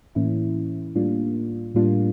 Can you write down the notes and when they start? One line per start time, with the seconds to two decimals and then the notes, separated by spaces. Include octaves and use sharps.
0.15 A2 E3 A#3 C#4 E4
0.95 A2 G3 A#3 D4 F4
1.75 A2 G3 A#3 D4 F4